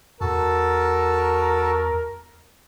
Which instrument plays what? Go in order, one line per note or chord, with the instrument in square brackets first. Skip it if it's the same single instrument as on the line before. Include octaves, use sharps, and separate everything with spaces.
[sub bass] E2 [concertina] F#4 A4 A5 [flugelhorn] A#4